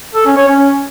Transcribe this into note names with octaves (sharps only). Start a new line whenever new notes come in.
A4
C#4
C#5
C#4